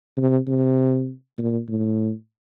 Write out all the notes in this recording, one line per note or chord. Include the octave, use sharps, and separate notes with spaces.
C3
C3
A#2
A2